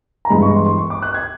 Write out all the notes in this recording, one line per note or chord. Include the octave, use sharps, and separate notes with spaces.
A#5
G2 E3 G#3 B3 B5
C#6
C6
C6
C#6
D6
F#6
G#6